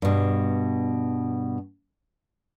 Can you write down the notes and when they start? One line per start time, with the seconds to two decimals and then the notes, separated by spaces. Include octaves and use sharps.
0.02 G2 B2